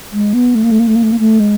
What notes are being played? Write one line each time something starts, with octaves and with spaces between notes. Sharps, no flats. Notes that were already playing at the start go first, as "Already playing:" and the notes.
G#3
B3
A3
A#3
A3
A#3
A3
A#3
A3
A#3
A3
G#3